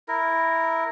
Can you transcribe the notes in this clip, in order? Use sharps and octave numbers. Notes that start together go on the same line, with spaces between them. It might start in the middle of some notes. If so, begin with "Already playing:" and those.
E4 A#4